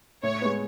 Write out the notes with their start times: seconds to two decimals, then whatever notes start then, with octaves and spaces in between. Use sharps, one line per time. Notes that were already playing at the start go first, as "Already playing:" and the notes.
0.23 A2 C#5
0.42 G#3 B3